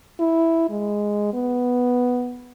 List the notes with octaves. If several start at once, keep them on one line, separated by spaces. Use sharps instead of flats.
E4
G#3
B3